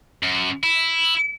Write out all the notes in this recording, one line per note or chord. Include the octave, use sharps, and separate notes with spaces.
F#2
E4